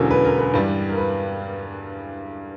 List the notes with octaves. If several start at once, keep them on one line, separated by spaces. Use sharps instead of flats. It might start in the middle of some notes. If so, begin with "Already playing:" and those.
Already playing: E1 E2 D3 F#3 C#4 A#4
B4
A#4
B4
G2 E3 G3
A#4
B4